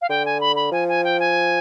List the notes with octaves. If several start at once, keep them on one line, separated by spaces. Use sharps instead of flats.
F5
D3 G5
G#5
B5
B5
F3 G#5
G#5
G5
G#5